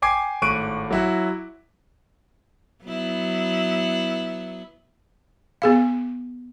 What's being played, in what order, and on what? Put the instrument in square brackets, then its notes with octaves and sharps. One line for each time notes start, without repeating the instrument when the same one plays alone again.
[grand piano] G5 G#5 D6 G#6 C7
G#1 A2 C#6 F#6 D7 D#7
F#3 E4 F#4
[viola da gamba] F#3 B3 E4
[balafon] B3 G#4 F5